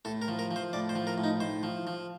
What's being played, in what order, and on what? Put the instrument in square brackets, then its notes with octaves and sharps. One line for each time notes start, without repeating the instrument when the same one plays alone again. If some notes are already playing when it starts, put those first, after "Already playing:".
[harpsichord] A2 A4
A#4
F3
A#4
F3
C5
A2 D5
C5
F3
A#4
A2
D#4
A2 C5
F3
F3